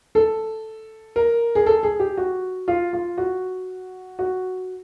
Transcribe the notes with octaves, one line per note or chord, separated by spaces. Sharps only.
A4
A#4
G#4
A4
G#4
G4
F#4
F4
F4
F#4
F#4